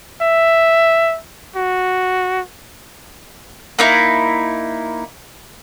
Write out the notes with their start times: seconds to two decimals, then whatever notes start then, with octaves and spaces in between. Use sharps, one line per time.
0.22 E5
1.56 F#4
3.79 A#3 D#4 E4